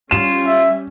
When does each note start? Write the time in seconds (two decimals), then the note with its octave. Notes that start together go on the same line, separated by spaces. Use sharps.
0.11 G3 C#4 F4 E7
0.46 E5